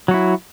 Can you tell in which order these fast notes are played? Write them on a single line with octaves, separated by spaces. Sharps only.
F#3 F#4 E4